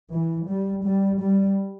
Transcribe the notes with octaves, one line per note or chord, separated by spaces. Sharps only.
E3
G3
G3
G3